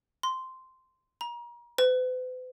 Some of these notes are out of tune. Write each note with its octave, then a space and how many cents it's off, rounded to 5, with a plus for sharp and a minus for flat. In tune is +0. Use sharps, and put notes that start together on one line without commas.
C6 -10
A#5 +35
B4 +45